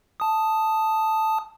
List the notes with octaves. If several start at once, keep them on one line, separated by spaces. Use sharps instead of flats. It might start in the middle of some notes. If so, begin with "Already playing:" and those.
A5 D#6